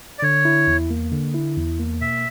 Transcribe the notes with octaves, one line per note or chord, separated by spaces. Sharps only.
D5
D3 C#5
E4
E2
A#3
D3
E4
E2
A#3
B2 E5